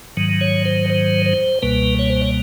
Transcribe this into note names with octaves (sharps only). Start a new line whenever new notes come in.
G#2 D#3 F#3
C#5
C5
C5
C5
C#2 B2 G3 A#3 B4
C#5
C5
C#5